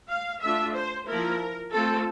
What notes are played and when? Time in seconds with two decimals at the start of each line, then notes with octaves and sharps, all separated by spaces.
0.09 F5
0.41 A3 D4 F4 E5
0.75 C5
1.07 F3 A#3 E4 A#4
1.72 A3 C4 F4 A4